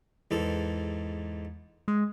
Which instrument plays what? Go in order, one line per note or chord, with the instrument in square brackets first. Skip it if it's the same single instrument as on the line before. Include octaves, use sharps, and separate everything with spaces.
[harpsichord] E2 G#2 A4
[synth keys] G#3